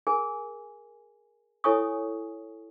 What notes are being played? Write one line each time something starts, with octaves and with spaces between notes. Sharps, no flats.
G#4 A#4 G#5
E4 A4 C#5 G#5 C#6 D#6